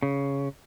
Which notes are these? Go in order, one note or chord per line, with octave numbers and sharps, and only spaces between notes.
C#3